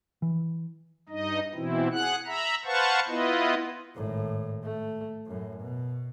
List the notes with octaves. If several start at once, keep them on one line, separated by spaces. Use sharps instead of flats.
E3
G2 D#4 D#5
B2 E3 C4 E4
G#4 F#5 F#6
E5 A#5 B5
B4 C5 F5 F#5 A5 C#6
B3 E4 F4 B4 D#5
G#1 A2
A3
F#2 A2
B2